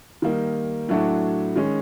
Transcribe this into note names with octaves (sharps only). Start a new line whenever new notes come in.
D#3 G3 A#3 D#4
A2 F#3 A3 D4 F#4
D#3 G#3 C#4